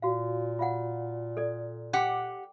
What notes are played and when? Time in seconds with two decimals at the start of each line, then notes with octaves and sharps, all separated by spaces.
0.02 A#2 F#4 F5
0.59 F4 F5 F#5
1.37 A4 D5
1.93 G4 F#5 G5 D6